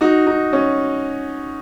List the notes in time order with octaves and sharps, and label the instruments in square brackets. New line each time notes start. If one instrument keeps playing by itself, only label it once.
[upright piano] D#4 F#4
D#4
C#4